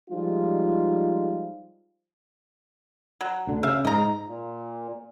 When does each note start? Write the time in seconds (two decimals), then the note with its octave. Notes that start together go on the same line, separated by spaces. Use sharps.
0.11 F3 G3 G#3 D#4 F4
3.21 F#3
3.47 D2 D3
3.63 C#3 E5 F5
3.85 G#2 D#5 A#5
4.26 A#2